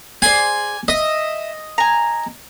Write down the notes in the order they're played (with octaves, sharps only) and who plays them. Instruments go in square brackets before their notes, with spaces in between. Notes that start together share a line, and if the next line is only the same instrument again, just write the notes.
[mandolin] G#4 C5 D5 [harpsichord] G#5
[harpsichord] D#5 [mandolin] E5
[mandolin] G#5 A#5